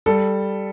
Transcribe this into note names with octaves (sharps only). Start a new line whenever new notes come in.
G3 A4